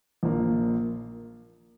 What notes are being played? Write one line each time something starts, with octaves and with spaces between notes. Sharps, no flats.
A#1 A#2 A#3